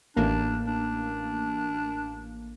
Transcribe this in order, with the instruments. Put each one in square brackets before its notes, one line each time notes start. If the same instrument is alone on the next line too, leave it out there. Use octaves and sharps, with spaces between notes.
[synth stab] A1 A#3 [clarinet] D4
[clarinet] D4